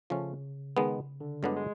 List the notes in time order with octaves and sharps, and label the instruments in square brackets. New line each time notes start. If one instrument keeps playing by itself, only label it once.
[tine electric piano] C#3 [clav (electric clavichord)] F3 A3 C#4
[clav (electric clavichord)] D#3 G#3 B3
[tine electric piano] D3
[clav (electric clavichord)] G2 D3 F#3 B3 D4 [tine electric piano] G#3
[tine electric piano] G#3